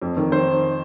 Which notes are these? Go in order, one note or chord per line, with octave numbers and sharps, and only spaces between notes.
F2
D#3
D#3 C5